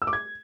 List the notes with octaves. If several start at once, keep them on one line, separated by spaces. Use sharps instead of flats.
E6
D6
G#6